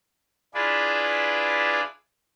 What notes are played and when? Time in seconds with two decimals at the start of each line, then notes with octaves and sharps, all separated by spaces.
0.54 D4 E4 F4 G#4 B4 D5